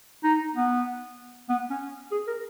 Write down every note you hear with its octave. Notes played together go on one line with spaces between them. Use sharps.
D#4
B3
B3
C#4
G#4
A#4